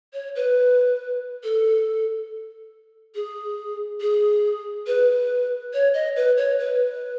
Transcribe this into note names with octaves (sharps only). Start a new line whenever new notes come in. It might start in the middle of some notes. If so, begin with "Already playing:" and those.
C#5
B4
A4
G#4
G#4
B4
C#5
D#5
B4
C#5
B4